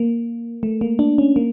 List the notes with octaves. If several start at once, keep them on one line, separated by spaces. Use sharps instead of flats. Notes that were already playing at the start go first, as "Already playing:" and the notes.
Already playing: A#3
A3
A#3
D4
C#4
A#3